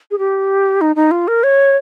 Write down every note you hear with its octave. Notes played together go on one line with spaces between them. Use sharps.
G#4
G4
D#4
D#4
F4
A#4
C#5